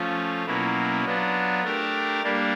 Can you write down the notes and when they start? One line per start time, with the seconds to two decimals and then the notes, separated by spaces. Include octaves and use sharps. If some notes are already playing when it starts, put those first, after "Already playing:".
Already playing: F3 A3 C#4 F4
0.46 B2 F#3 A#3 C#4 E4
1.04 F#3 B3 D4 F4
1.63 A3 D4 G4 A#4
2.23 G3 A#3 D4